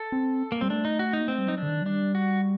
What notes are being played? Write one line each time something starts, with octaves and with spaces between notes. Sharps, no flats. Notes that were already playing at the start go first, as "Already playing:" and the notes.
Already playing: A4
C4
A#3
G3 C4
A3 D4
D#4
F#4
D#4
A#3
A3 C4
G3
F#3 D#4
D4
D3
D#3
F#3
G3 D4
F#4